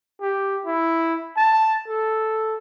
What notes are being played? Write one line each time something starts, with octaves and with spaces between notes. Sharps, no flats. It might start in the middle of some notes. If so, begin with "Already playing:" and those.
G4
E4
A5
A4